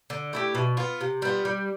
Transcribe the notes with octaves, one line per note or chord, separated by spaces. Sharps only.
D3
A3 E4 G4
B2
B3 F4
C3
G3 B3 F4
G3